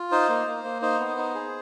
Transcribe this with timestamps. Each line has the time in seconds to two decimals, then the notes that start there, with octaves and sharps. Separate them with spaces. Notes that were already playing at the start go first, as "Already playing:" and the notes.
Already playing: F4
0.11 D#4 C5
0.29 A#3
0.47 A#3
0.64 A#3
0.82 D#4 C5
1.00 B3
1.18 D#4
1.35 G#4